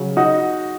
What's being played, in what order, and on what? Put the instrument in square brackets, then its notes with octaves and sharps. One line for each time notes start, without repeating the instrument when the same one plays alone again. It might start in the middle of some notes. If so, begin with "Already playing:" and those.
Already playing: [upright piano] C#3 F#3
D#4 F#4